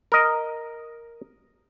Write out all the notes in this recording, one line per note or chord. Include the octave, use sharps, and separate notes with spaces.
A#4 D#5